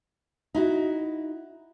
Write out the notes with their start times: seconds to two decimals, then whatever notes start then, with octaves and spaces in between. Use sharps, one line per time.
0.54 D#4 E4 F#4